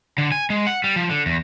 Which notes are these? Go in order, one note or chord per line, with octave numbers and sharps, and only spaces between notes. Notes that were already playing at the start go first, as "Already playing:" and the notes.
D3
G#5
G#3
F#5
G3
F3
D3
E2